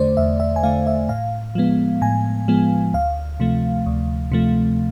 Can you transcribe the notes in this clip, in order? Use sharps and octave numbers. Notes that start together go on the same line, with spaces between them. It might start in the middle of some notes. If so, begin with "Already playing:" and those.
Already playing: E2 D3 A3 C5 D5
E2 E5
E5
G#5
D3 A3 F5
E5
A2 F5
F3 G#3 B3
A2 G#5
F3 G#3 B3
D2 F5
C3 F3 A3
D2
C3 F3 A3